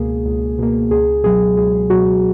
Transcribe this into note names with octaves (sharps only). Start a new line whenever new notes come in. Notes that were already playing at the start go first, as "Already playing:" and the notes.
Already playing: C#2 B2 A#3 G#4
C#2
B2 A#3
C#2 G#4
B2 F#3 G#4
C#2 G#4
B2 F#3 F#4